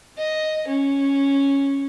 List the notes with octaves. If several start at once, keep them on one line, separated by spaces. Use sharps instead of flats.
D#5
C#4